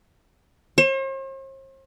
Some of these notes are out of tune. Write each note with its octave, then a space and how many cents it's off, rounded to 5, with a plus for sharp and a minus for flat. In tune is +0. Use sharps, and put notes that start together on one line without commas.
C5 +45